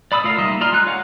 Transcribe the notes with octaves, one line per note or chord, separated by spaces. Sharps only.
D5 B5 D#6 E6
A3 F4 A#4 F5
G3 A#3 D#4 D#5 E5
F4 D5 A#5 C6 F6
G#3 D#4 F4 F#6
C#5 F5 F#5